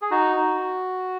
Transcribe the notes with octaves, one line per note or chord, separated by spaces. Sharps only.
G#4
D#4 F#4
D#4